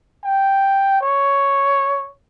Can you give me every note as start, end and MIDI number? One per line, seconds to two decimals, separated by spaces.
0.24 0.98 79
1.01 2.10 73